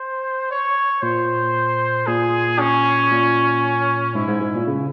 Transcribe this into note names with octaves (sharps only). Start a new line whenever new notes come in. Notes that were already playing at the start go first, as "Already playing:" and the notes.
Already playing: C5
C#5
A#2 C5
A#2 G#4
C#4
A#2
G#2 E4
G#2
G#2
A#2
C#3